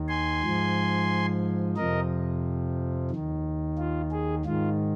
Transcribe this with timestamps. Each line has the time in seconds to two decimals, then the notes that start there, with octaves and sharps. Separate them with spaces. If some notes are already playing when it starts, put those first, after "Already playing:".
Already playing: D#2 D#3
0.08 G#5 C6
0.43 G#2 F3
1.76 F2 C3 F3 A#4 D#5
3.11 D#3
3.16 D#2
3.78 F4
4.11 G#4
4.45 G#2 D#3 F4